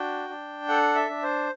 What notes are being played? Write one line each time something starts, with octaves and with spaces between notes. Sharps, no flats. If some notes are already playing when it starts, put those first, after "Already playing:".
Already playing: D4 F#4 G5
D4
A4 F#5
E5
D4
C5